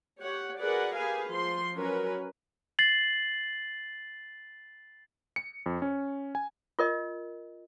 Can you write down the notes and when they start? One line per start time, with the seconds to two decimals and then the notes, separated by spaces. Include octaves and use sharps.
0.19 G4 C#5 F#5
0.60 F#4 G#4 A#4 B4 D5 F#5
0.97 G4 G#4 B4 F5 G#5
1.28 F3 C6
1.75 F#3 C#4 A#4 B4
2.79 A6 C7 F#7
5.36 C#7
5.66 F2
5.82 C#4
6.35 G#5
6.79 F4 A#4 D#5